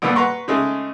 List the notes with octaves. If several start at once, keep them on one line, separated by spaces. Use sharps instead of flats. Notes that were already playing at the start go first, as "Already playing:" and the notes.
A#1 A2 D3 B3 A4 B5
B4 F#5 A#5 C6 C#6
C#3 G#3 A3 D#4